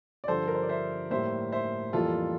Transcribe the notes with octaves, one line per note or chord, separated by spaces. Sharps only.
D5
G2 D3 F3 A4 C5
A#4
C5
D5
C5 E5
A2 G3 A#3 C5 E5
C5 E5
F2 E3 G3 A#3 F4 A4